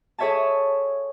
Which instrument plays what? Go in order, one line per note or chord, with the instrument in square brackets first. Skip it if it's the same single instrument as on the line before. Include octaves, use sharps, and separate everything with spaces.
[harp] G#4 A4 C#5 E5 G#5 A5